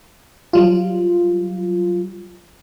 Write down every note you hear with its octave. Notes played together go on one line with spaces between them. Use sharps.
F#3 G3 F4